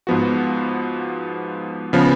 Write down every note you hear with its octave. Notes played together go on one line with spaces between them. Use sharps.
G#2 F3 B3 F#4
C#3 F3 B3